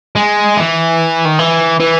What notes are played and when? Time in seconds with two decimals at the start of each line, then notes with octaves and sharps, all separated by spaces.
0.15 G#3
0.57 E3
1.25 D#3
1.39 E3
1.80 E3